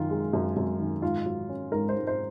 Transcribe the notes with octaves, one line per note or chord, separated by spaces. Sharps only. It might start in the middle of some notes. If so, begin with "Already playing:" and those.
Already playing: F#2 D#3 F4
G#3
F#2
F#2
D#3
G#2 F4
F#3
C#4
G#2 A#4
C5
G#2
C5